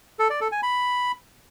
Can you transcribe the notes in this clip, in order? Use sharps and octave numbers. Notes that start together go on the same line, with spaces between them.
A4
D5
A4
G#5
B5